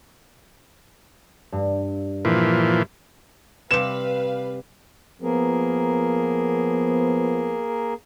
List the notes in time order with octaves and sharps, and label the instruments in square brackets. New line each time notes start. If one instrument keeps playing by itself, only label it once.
[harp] G2
[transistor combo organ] A#2 E3 F3
[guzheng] C3 G3 [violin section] B4 F5 [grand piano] E7
[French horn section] F3 B3 [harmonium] A#3 G#4 A#4